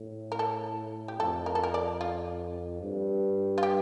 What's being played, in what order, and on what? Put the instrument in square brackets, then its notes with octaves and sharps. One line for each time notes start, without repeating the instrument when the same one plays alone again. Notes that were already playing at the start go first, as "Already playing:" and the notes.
Already playing: [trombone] A2
[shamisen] A#4
A4
G4
[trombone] F2 [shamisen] A4
[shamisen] A#4
A4
A#4
D5
F4
[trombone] G2
[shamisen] F4
G4